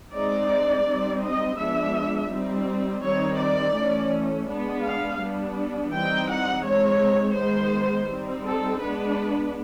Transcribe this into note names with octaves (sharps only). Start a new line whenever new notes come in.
G#3 C4 D#4 D5
G3 C4 D#4
D#5
F3 G#3 B3 D4 E5
G3 C4 D#4
D#3 G3 C4 D#4 C#5
D5
E3 A3 C#4
G#3 B3 D4
F5
G3 B3 D4
E3 G3 C4 D#4 G5
F#5
G#3 C4 D#4 C#5
D#3 G#3 B3 C5
G3 C4 D#4
A4
G#3 B3 D4 B4